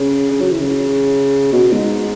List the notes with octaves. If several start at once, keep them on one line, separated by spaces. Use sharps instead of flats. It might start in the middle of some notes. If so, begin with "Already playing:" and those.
Already playing: C#3
C#3
F#3
E3
C#3
B2
G#2